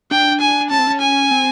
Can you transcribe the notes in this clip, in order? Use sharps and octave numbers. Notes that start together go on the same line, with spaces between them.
D4 G5
G#5
C#4 A5
C4
C#4
G#5
C4